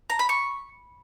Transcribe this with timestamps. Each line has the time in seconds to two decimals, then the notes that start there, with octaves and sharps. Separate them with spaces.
0.10 A#5
0.19 B5
0.29 C#6